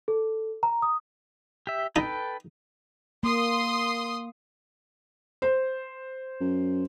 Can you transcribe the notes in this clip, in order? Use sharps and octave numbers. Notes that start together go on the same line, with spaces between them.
A4
A#5
D#6
G4 E5
D#4 A4 B4 G5
A#3 C6 D#6
C5
F#2